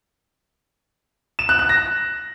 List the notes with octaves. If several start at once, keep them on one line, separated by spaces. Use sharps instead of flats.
E7
F#6
F#6
A#6